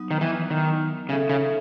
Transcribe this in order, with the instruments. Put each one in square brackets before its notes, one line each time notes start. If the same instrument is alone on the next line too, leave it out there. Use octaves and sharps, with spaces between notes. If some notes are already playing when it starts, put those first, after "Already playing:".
Already playing: [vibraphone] F#3 B3 D#4
[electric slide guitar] D#3
E3
D#3
[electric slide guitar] C#3 [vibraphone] D#4 A4 E5
[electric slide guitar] C#3